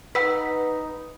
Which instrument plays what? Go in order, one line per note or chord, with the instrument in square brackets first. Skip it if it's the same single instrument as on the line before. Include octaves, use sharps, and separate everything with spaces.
[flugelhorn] D#4 [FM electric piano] B4 [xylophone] F#5 E6 B6